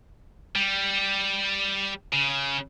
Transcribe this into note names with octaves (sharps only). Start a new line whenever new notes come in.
G3
C#3